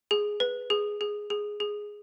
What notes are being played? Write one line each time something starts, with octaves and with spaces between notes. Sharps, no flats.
G#4
B4
G#4
G#4
G#4
G#4